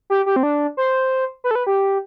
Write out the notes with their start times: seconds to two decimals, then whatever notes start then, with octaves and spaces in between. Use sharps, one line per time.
0.10 G4
0.26 G4
0.36 C4
0.43 D4
0.77 C5
1.44 B4
1.51 A4
1.55 B4
1.67 G4